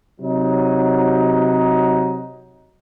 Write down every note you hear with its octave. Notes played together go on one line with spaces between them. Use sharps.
C3 F#3 D#4